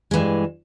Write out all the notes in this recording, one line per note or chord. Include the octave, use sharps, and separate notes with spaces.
G2 E3 G#3